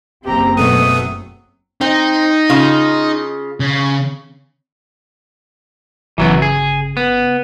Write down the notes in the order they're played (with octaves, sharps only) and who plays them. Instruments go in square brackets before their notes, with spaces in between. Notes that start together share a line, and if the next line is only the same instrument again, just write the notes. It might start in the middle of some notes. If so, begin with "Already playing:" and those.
[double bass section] F#1 C4 [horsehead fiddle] G4 A#5
[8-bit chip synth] B2 A3 B3 [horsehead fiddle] F#3 [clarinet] D#6
[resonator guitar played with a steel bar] C4 [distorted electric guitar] D#4
[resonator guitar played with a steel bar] C#3 F4
[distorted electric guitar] C#3
[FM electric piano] G1 C#3 [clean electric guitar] E3 F#3 B3
[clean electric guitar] G#4
B3